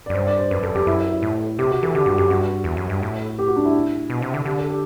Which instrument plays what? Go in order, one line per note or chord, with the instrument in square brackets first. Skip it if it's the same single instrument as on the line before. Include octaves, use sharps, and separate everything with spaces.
[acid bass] F#2 [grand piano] D5
[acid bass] G2 [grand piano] C5
[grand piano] D5
C5
[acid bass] F#2 [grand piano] B4
[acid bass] F#2 [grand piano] A4
[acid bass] F#2 [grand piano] G4
[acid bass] F#2 [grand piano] E4
[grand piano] E4
[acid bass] A2
[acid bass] C3 [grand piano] G4
[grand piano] F#4
[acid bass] E3 [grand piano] A4
[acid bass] D3 [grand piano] G4
[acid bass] G2 [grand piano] F#4
[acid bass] F#2 [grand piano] G4
[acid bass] G2 [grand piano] F#4
[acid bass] E2
F#2
G2
A2
[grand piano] G4
F#4
D4
E4
[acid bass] B2
C3
D3
[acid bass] D3 [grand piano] G4
[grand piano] A4
G4